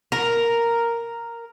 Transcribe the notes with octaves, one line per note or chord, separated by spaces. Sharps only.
A#4